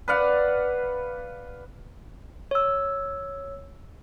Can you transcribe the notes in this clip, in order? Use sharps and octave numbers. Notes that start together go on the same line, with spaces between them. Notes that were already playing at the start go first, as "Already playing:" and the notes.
B4 D5 F5 F#5
C#5 E6